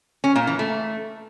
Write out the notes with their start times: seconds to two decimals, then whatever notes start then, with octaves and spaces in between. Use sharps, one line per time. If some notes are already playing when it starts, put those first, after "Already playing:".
0.24 C#4
0.36 A#2
0.47 E3
0.59 A3